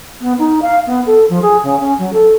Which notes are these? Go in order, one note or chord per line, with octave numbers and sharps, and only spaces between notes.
B3
D#4
F5
B3
A4
F3
G#4
C#3
C#4
F#3
A4